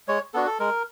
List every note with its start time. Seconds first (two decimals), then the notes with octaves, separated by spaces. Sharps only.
0.08 G#3 C#5
0.34 B3 D4 F#4 A4
0.47 A4
0.60 G#3 A#4